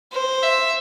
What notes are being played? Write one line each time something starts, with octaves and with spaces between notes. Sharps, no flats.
C5
E5